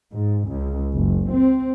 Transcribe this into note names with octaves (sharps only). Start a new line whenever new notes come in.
G#2
C#2
F#1
C4